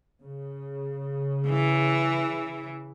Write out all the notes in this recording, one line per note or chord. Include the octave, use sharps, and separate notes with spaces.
C#3
E3